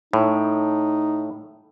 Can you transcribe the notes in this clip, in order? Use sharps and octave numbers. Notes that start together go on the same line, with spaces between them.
A2 D#4